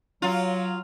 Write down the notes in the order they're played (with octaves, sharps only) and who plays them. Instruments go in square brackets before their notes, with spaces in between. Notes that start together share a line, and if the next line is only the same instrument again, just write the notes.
[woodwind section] F#3 [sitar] F4